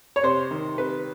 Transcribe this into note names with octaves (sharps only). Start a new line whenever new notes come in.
C#5
C3 C5
D#3
C3 B4